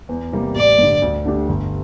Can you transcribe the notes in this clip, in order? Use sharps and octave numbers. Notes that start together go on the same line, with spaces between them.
E2
C3 G3 A#3
A1 D5
G2 D3
D2
D3 A3 D4 G4
G1